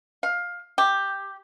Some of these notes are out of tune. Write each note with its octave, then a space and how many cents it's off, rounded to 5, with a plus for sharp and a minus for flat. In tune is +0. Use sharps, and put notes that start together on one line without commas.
F5 +15
G4 +5